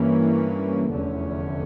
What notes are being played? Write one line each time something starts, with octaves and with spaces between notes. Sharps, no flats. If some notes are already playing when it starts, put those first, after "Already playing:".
Already playing: G2 E3 A#3 C#4
F1 E2 D3 A3 C#4